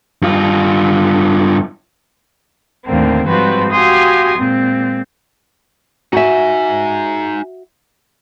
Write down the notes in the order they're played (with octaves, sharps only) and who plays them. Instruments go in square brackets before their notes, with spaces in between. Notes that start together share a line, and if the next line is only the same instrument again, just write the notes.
[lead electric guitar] G2 F4
[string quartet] D#2 A2 D3 A3 A#3 C4
G#2 F3 G3 C4 F#4 B4
F#4 G4 F5 G#5 C6 D#6
A#2 G#3 C4
[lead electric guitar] D#4 G#5 [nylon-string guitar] F#4 E5